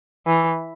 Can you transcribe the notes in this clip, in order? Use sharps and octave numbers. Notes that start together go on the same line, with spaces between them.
E3